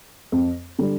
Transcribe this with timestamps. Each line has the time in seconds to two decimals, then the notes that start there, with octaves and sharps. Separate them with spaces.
0.32 F2
0.79 D3 G3